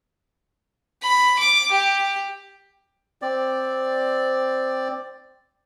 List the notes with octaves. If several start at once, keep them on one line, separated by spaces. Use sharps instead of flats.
B5
D6
G4
C4 D5